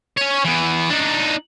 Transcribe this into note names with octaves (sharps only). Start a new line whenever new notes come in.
C#4 C#5
E3 B3
D4 D#4